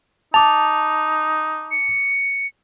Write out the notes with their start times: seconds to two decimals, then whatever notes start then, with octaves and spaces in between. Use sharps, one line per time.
0.34 D#4 A5 D6 F7
1.71 C#7